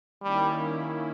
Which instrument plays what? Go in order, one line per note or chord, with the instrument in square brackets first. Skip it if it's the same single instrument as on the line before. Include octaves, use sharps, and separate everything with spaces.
[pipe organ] D#3 A#3 C#4 E4 [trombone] G3